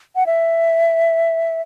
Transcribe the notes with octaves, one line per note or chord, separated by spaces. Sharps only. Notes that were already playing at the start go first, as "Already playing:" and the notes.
F#5
E5